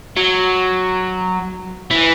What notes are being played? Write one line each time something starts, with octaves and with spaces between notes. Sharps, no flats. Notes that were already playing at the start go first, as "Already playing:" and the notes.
F#3
E3